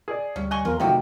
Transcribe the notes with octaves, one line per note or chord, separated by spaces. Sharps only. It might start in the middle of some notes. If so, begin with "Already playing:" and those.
G#4 D5
D2 G3 C#4
D#5 G#5 C#6 F#6 G7
E2 F3 F4 A#4
C3 D#3 F3 F#3 A3 D#4 F#4 G5